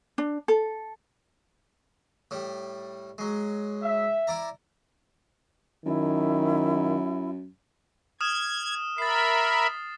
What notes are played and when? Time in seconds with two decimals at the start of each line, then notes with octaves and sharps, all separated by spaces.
0.18 D4
0.48 A4
2.31 A2 G3
3.18 F#3 G#3
3.83 E5
4.27 E4 D5 A#5
5.86 F#2 D#3 E4
8.21 D#6 F6 G#6 E7
8.98 A#4 E5 B5 A6 C7